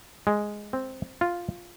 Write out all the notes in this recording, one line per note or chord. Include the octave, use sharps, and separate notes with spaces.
G#3
C4
F4